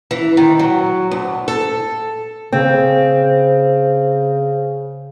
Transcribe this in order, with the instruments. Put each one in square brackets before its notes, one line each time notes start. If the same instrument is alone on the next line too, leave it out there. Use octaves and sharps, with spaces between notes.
[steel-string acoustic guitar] E3
D#3
F#3
D2
A4
[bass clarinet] C#3 [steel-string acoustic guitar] C4